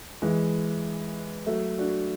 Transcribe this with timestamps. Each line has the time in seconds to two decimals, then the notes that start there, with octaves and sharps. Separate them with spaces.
0.22 E3 G#3
1.46 F#3 A3
1.78 D4 F#4